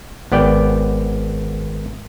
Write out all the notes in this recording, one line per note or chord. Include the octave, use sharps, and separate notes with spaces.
G#1 B3 D5 G5